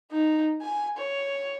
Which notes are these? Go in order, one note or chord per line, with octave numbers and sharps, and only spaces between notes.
D#4
G#5
C#5